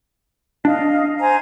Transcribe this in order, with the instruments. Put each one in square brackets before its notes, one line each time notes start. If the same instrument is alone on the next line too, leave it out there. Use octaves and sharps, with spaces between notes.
[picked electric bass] D4 [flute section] D#5 F5
[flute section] C5 G#5 A#5